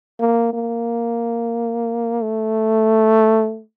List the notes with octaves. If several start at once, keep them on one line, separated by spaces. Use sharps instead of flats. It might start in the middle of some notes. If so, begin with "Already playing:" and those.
A#3
A#3
A3